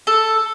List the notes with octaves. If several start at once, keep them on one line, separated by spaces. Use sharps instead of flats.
A4